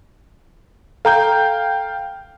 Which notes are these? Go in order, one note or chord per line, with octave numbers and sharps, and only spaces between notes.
A4 F5 G5 A#5 G6